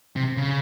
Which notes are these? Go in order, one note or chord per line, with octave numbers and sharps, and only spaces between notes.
C3
C#3